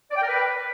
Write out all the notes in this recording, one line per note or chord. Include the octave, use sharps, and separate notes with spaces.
D5
G5
A#4
B4